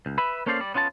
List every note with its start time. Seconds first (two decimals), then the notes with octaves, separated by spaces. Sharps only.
0.06 C#2
0.18 B4 E5 B5
0.46 A#3 C#4 A4 C5 D5 F5
0.60 G3 D5
0.74 B3 C#4 F4 F5 A5